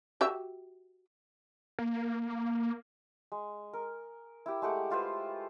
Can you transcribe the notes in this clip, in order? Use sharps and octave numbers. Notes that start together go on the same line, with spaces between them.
F#4 G4 E5
A#3
G#3
A#4
E4 G4
G#3 A3 G4 F#5
E4 F4 B4 C5